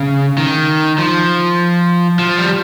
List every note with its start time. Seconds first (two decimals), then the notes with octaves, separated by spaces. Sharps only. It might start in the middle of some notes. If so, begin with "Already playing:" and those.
Already playing: C#3
0.38 D#3
0.98 F3
2.19 F3
2.38 G3